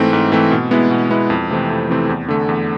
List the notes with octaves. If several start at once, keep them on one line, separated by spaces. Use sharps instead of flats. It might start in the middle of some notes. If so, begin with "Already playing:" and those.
Already playing: G#2 E3 A3 C4
G#2
E3 A3 C4
B2
G#3 B3 E4
B2
G#3 B3 E4
F2
C3 E3 A3 C4
F2
C3 E3 A3 C4
E2
D3 A3
E2